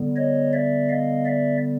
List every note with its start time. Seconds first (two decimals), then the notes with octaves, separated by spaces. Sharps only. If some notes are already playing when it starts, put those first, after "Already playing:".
Already playing: D3 G3 B3
0.16 C#5 D#5
0.53 D5 E5
0.89 D#5 F5
1.25 D5 E5